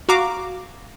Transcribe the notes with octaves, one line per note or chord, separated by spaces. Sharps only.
F#4 F5 A#5 D6